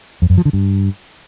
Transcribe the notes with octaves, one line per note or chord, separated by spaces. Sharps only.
F2
F#2
F3
D3
G2